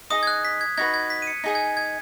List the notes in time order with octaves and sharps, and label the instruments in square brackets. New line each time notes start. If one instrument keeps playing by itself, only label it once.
[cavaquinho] D#4 G#4 D#5 [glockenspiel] D#6
[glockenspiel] G#6
F#6
B6
G#6
[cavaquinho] D#4 F#4 B4 [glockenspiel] G#6
[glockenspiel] G#6
B6
D#7
C#7
[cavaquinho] D#4 G#4 D#5 G#5
[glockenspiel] G#6
G#6